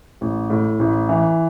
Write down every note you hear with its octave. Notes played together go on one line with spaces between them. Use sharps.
A1
A2
A1
E3